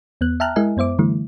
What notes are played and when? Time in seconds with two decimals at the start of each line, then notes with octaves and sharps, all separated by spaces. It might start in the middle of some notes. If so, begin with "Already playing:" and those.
0.21 E2 B3 F#6
0.40 E5 G5 A5 A#5 F6 F#6
0.56 G#3 E4 A#4 D#5 E5 G#5
0.77 F#2 B3 C5 E5 D6
0.99 D3 E3 G3 A3 E4